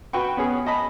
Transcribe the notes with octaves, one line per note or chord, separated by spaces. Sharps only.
F#4 B4 G5 C#6
B3 C#4 G#4
D#5 A5 B5